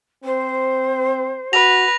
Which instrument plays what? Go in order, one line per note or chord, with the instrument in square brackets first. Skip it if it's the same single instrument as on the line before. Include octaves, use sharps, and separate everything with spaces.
[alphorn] C4 [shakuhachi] C5
[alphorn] F#4 [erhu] B4 [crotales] A#6 F7